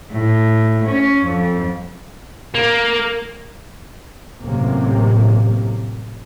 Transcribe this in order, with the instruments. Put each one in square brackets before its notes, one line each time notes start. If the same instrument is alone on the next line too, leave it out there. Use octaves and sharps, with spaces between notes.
[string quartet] A2
C#4
F2
[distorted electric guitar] A#3
[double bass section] A1 F#2 A2 C3 A#3